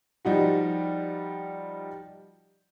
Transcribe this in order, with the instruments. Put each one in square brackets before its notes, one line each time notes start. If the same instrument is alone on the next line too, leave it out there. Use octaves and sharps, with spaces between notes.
[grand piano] F3 G3 D#4 F#4